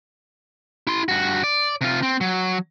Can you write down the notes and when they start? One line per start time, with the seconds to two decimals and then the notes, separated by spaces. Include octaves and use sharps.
0.87 E4 C6
1.09 G2 F#4
1.44 D5
1.81 C3 F4
2.03 C4
2.21 F#3